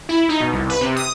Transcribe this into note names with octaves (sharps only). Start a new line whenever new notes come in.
E4
D#4
B2
C2
B4
C3
D#6